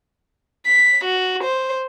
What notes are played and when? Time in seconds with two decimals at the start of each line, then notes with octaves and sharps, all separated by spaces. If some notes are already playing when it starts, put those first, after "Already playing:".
0.66 B6
1.05 F#4
1.44 C5